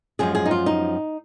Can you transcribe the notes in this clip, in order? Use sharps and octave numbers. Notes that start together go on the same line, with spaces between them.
F#2 F3 G#3 G#4
G#4
D#4
F4
D#4